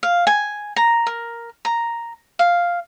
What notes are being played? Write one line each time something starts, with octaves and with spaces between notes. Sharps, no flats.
F5
G#5
A#5
A#4
A#5
F5